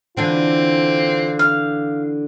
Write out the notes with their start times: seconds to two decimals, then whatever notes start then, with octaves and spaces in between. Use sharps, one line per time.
0.17 D3 E3 C4 D4 F4
1.39 F5